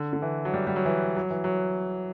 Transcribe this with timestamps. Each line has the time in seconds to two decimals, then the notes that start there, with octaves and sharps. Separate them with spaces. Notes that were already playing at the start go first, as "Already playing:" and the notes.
Already playing: D3
0.13 D3
0.22 E3
0.45 F#3
0.54 G3
0.67 G3
0.76 F#3
0.85 E3
1.16 F#3
1.30 E3
1.44 F#3